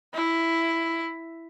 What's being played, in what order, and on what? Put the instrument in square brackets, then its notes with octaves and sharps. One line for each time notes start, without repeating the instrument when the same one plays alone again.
[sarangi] E4